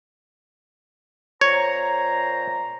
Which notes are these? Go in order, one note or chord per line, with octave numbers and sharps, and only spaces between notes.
A#2 C5 C#5 A#5